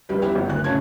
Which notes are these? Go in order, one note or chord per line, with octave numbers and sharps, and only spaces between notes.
F1 G3 B4
B3 C4 E4 G4
G1
F#1 D2 F#6
A2 C#3 C#4 A5 G#6